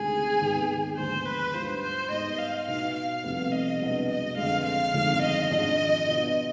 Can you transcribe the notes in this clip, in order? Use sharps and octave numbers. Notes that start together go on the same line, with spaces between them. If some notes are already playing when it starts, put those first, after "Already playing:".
Already playing: D2 C3 D#3 G#3 G#4
G#1 G#2 D#3 B3 D#4
D#2 D3 F3 G#3 B3 C5
B4
G#2 G3 D4 F4 C5
C5
G#2 G3 B3 D#4 D#5
F5
B2 B3 D#4 F5
F5
F1 F2 C3 G3 B3
D#5
C2 B2 G#3 B3 D4
D#5
F2 D3 G#3 F5
F5
G1 F2 D#3 G#3
D#5
G#1 G#2 F3 G#3 D4 D#5
B2 B3 D4 F4